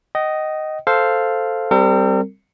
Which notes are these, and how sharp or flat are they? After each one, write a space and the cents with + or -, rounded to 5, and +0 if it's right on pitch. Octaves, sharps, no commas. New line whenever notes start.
D#5 +0 G5 -45
A4 +0 C5 +0 F5 +0
G3 +0 C4 +0 A#4 -45